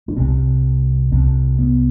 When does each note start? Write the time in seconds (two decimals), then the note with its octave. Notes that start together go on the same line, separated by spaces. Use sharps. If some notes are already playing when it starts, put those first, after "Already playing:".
0.08 D4
0.16 C2 C3 C4
1.11 C2 C3 C4
1.58 B3